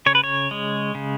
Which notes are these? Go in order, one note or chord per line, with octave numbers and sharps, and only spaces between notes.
C#3 C#5
B4
C#5
G#3
C#3